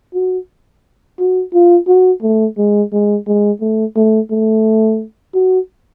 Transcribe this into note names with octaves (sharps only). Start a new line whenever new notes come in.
F#4
F#4
F4
F#4
A3
G#3
G#3
G#3
A3
A3
A3
F#4